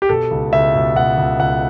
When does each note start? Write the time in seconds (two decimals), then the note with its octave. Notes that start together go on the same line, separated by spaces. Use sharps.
0.02 G4
0.09 B2 A4
0.31 C#2
0.53 C#2 E5
0.74 B2
0.95 B2 F#5
1.18 C#2
1.39 C#2 F#5